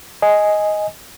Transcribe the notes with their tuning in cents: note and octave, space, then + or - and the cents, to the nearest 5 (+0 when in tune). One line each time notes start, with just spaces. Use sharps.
D#5 +5 G#5 +0